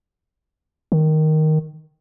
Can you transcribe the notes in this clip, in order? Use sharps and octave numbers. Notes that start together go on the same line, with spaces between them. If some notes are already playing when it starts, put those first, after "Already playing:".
D#3